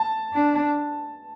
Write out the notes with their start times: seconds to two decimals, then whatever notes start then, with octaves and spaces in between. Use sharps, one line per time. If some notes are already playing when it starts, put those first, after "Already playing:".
Already playing: A5
0.33 D4